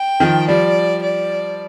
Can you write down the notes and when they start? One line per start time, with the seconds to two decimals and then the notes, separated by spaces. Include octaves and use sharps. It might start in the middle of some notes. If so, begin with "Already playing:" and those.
Already playing: G5
0.20 D#3 F3
0.48 F3 G3 D5
1.02 D5